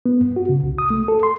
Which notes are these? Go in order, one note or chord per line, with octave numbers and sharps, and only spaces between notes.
B3
G2
F#4
C#3
C2
D#6
A3
A4
C6